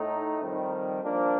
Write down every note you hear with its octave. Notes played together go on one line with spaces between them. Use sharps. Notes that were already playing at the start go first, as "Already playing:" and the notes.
Already playing: A2 A3 D#4
F2 D#3 G3
F3 A#3 D4